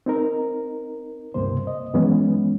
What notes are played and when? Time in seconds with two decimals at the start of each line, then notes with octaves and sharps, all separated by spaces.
0.06 C4 D#4 A#4
1.34 C#2 G2 C3 A#3 C5
1.67 D#5
1.94 F#2 E3 G#3 B3 C#4